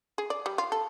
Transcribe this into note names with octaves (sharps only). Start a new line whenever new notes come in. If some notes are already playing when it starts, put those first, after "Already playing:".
G#4
D5
G3
F4
A4